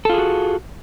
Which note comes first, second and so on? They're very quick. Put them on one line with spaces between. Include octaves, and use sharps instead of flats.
A4 F4 G#4 F#4